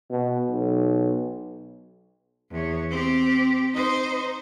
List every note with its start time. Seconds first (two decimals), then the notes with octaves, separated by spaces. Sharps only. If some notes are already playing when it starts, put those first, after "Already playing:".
0.10 B2
0.50 B1
2.51 E2 C#5
2.90 C4 G4
3.74 D#4 C5